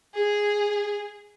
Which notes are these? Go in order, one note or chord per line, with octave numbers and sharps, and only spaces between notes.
G#4